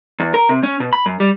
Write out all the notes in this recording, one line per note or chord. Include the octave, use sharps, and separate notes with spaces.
E2
A#4
C3
C#4
B2
B5
F#2
G3